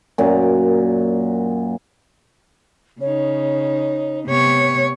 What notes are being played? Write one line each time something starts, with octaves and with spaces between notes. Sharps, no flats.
F#2 A#2
C#3 D#4 C#5
C3 B3 C#5